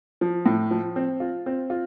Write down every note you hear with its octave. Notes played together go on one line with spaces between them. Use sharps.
F3
A2
F3
C4
F4
C4
F4